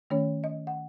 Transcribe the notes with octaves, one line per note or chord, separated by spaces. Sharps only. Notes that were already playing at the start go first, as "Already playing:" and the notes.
D#3 A3 C#4 C#5
D#5
F#5